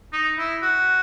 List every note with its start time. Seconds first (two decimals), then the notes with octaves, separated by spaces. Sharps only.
0.13 D#4
0.38 E4
0.62 F#4